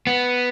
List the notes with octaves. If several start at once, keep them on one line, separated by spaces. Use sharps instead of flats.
B3